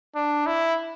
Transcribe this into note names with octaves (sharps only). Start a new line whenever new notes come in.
D4
E4